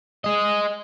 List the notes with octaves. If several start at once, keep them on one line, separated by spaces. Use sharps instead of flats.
G#4 D#5